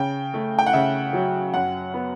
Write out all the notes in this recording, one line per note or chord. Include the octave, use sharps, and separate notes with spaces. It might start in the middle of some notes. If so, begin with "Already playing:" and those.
Already playing: C#3 G5
A3
G5
F#5
C#3 E5
F#3
F#2 F#5
B3